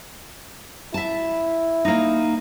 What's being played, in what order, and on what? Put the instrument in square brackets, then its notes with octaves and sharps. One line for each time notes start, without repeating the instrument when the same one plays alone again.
[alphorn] E4 [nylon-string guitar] E5 A5
[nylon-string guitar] A#3 D#4